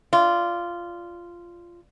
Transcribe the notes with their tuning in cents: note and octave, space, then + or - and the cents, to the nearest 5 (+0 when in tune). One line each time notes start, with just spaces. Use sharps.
F4 -10 D5 +0